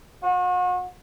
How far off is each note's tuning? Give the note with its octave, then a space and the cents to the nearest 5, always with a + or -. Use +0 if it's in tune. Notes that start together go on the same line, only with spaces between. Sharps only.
F#4 -40